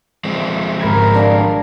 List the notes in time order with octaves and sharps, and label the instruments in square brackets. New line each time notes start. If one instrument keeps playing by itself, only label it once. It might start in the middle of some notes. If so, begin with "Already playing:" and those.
[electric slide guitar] F3 G#3 C4 [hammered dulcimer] E5
[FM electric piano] G#1 B5 G#6 [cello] A#4
[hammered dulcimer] D4 F5 G5